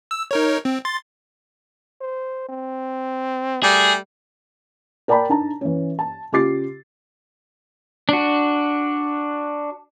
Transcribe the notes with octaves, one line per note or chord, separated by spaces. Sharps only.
E6
D#4 A#4 C#5
C4
C6 A6
C5
C4
G3 A3 G#4
A#4 D5 G5 A5 B5
D4 D#4 A5 A#5
E3 C#4
A5
C#3 F4 G4 D6 A6 C7
D4 F#4